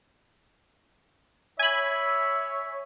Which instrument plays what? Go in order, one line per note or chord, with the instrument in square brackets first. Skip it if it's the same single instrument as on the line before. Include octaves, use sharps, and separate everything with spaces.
[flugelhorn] C#5 [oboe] E5 [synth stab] G#5 B5